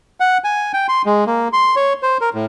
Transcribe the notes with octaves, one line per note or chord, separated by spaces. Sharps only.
F#5
G#5
G5
C6
G#3
A#3
C6
C#5
C5
A#4
A2